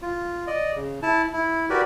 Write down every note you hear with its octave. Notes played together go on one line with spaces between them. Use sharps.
F4
D5 D#5
C#3
E4 A5
E4
F#4 G4 A#4 B4 D5